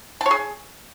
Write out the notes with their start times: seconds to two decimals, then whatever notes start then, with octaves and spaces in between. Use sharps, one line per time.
0.21 A5
0.26 C#5
0.31 G#4